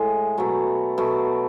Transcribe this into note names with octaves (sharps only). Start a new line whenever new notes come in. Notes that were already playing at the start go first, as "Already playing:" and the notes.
Already playing: A2 G#3
B2 F#3 A3
B2 F#3 A3